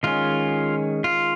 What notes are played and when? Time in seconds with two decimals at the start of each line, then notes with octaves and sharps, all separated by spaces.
0.03 D#3 G#3 C#4 F4
1.04 F4